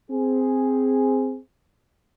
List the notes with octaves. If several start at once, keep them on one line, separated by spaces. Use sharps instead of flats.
C4 G#4